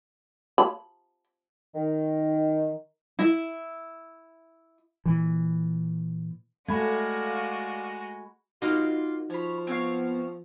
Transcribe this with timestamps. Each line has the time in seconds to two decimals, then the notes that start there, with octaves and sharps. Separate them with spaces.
0.58 B5
1.75 D#3
3.19 E4 E5
5.06 A#2 E3
6.69 G#3 A3 F#4 D5 F5 A#5 B5 G#6
8.62 A#3 D#4 F4 F#4 D#5 C6 F6
9.30 F3 C#5 B5
9.67 B3 C4 C#5 F5